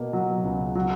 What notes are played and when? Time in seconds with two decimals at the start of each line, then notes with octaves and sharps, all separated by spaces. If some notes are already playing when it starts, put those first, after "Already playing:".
Already playing: B2 A#3
0.13 F#3
0.44 C#2
0.75 F#3